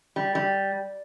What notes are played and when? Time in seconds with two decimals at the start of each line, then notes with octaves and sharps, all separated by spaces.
0.16 G3
0.35 G3